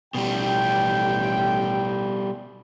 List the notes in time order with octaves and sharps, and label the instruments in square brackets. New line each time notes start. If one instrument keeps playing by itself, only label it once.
[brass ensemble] A1 G5 [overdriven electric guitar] B2 G3